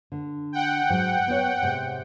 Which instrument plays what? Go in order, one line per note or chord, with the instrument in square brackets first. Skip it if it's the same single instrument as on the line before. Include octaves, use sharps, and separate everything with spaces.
[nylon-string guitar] D3
[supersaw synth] F#5 G5
[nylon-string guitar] G#2 F#3
B3 C#5
G#2 C3